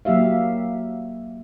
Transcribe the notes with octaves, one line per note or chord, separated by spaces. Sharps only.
F#3 A#3 G4 E5 F5